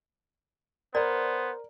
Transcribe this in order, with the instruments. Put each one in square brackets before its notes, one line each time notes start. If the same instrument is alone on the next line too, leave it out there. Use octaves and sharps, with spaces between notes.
[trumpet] B3 [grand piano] A#4 [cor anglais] C5 [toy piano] D5